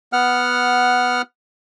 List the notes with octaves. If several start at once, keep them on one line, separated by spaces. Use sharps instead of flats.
B3 F#5 F6